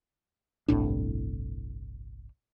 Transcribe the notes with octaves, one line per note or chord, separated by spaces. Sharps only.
G1 C2 A2 D4